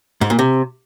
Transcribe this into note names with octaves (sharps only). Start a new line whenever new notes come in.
G#2
A#2
C3